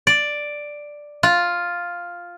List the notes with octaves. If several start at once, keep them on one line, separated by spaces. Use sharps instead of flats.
D5
F4